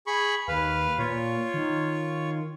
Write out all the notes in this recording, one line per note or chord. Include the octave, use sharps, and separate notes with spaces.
G#4 B5 C#6
D#2 B4 F5
A#2 F4 C#5
D#3